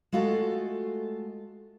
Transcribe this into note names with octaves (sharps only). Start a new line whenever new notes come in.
G#3 A3 F4 F#4 A4